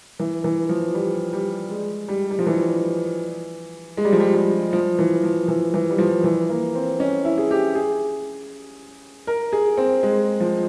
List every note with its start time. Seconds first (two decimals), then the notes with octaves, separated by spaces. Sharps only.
0.20 E3
0.44 E3
0.69 F3
0.94 G3
1.33 G3
1.70 G#3
2.08 G3
2.31 G3
2.39 F3
2.47 E3
3.97 G#3
4.05 G3
4.12 F3
4.20 G3
4.35 G3
4.73 F3
4.99 E3
5.23 F3
5.48 E3
5.74 E3
5.90 G3
5.98 F3
6.24 E3
6.49 A#3
6.75 C4
7.00 C#4
7.25 E4
7.38 G#4
7.51 G4
7.75 G#4
9.27 A#4
9.53 G#4
9.77 C4
10.03 G#3
10.40 F3